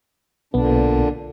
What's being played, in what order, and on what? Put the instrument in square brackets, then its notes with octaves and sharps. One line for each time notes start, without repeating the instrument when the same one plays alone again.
[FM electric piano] B1 B3 [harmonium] A#2 D3 D4